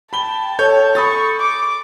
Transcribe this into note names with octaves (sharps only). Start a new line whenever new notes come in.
G5 A5 B5 G7
A4 C#5 G6
B5 C#6 D#6 A6
D6